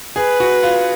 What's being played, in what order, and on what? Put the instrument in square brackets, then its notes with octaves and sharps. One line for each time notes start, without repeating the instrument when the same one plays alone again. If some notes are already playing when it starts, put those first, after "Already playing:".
[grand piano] G#4 [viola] B4
[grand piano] F#4
F4